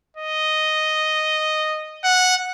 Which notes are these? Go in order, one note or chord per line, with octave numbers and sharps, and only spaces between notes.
D#5
F#5